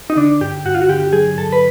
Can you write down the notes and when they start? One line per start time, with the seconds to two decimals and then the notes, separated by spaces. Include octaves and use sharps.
0.10 D#4
0.17 D3 D4
0.41 G2 G4
0.65 G2 F#4
0.75 F4
0.82 F#4
0.89 D3 G4
1.13 F#3 G#4
1.37 G2 A4
1.52 B4